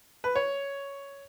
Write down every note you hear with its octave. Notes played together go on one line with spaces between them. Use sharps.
B4
C#5